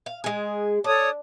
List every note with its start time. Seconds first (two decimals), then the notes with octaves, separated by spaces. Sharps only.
0.06 F5
0.24 G#3 G#4
0.84 D4 A4 C#5 D#6